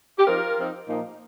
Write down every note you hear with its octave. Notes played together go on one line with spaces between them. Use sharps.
G4
F3 C4 D#4 F4 A#4
F3 C4 D#4
A#2 F3 A#3 D#4